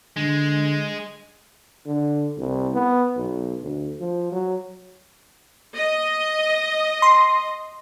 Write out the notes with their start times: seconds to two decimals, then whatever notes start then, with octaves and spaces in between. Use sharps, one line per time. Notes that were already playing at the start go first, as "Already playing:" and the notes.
0.17 D3 G#3
1.87 D3
2.38 C2
2.74 B3
3.17 B1
3.63 D2
4.00 F3
4.32 F#3
5.75 D#5
7.02 C6